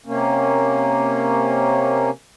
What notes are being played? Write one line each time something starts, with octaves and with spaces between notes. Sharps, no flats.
C3 A#3 C#4